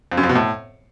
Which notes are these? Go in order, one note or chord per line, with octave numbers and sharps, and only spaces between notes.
F2
F#2
F2
B2
A2